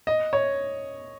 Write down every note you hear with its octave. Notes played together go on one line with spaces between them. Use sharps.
D#5
C#5